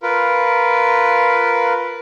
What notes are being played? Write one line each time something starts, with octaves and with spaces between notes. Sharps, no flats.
F4 A#4 B4